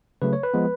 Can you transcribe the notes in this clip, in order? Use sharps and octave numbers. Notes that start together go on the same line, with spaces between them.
C#3 F#3 A3 B4
C#5
B4
F3 G#3 B3